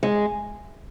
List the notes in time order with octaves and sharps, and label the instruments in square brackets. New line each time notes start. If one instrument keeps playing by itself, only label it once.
[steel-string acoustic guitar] G#3